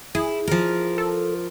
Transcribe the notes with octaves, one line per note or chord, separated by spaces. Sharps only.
E4 G#4
F3 A#4
A4